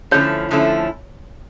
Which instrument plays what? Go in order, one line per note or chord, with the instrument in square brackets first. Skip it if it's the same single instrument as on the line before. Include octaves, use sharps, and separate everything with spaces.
[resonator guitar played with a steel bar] D3 F3 A3 C#4 E4 [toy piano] C#5
[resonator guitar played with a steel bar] D3 F3 A3 C#4 E4